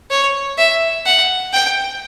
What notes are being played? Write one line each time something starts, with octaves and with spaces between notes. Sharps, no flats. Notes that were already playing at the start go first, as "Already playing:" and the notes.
C#5
E5
F#5
G5